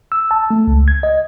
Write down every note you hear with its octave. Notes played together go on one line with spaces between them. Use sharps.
E6
A5
A3
C#2
G#6
D#5